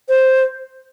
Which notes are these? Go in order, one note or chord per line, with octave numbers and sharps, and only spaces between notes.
C5